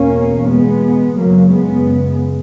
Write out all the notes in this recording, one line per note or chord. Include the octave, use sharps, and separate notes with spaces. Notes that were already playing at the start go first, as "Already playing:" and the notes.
Already playing: E2 B2 A#3 C#4
G#3 B3
F#2 C#3 F#3 A#3
G#3 B3